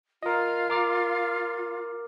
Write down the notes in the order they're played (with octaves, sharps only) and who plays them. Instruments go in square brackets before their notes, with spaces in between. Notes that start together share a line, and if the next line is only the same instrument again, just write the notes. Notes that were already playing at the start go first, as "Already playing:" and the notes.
[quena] F4 [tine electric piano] A#4 D#5
[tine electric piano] A#4 D6 F6